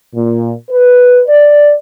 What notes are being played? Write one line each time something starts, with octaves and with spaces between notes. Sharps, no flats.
A#2
B4
D5